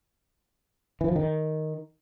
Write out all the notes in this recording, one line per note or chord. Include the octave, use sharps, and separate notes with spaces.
E3
F3
D#3